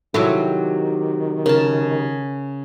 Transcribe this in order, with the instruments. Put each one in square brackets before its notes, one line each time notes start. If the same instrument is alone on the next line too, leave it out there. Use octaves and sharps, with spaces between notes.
[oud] C3 F#3 E4 [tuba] D#3 [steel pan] A4
[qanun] C#3 A5 [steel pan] A#4